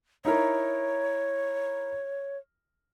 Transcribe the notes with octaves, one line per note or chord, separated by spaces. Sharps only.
D#4 E4 A#4 C#5